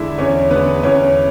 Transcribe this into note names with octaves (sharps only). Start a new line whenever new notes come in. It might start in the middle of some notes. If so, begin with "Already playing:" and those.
Already playing: E2 D3 G#3 D4 E4 E5
E2 C#4 C#5
D3 G#3 B3 B4
E2 C#4 C#5